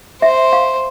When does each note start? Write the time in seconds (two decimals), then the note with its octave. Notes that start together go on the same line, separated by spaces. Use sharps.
0.22 C5 E5
0.53 F5